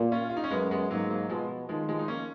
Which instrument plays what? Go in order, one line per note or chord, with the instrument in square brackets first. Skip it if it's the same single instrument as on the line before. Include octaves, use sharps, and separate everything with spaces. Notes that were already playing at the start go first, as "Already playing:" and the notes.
Already playing: [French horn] A#2
[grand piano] C#4 F4
F4
D#4
C#4
[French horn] F#2 [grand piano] G#3 B3
[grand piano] G#3 B3
[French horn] G#2 [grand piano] F#3 A#3
[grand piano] F#3 A#3
[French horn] B2 [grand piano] F3 G#3
[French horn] D#3 [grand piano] F3 G#3
[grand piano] F3 G#3
D#4
A#3 C#4